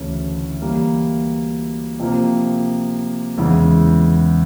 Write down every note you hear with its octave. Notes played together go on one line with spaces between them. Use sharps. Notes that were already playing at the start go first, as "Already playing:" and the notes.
Already playing: D2 C#3 E3 A3 C#4
E3 G3 A#3
C3 F3 A#3
E2 C#3 E3 G#3